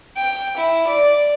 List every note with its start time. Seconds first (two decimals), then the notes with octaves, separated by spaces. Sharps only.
0.17 G5
0.58 E4
0.88 D5